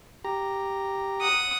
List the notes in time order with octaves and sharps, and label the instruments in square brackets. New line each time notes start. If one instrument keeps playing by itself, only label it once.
[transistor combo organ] G4 A#5
[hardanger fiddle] F#5 D#6